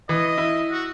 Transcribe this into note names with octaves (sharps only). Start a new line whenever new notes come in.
E3 D#5
E4
F#4